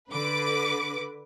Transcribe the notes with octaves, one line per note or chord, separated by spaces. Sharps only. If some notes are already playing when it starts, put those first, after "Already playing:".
D3 B4 D6